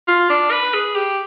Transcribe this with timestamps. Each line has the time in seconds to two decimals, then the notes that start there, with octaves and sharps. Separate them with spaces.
0.08 F4
0.30 D4
0.51 B4
0.74 G#4
0.95 G4